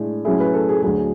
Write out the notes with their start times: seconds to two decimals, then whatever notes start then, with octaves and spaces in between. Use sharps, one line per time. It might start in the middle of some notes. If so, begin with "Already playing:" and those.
Already playing: A2 G#3 D4
0.25 A2 F#3 C#4 E4 G#4
0.40 B4
0.54 A4
0.69 G#4
0.82 D2 D3 F#3 G#4